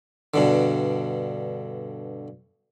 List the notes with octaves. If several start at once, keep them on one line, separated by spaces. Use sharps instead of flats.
G2 B2 D3